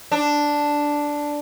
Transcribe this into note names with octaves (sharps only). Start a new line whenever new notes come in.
D4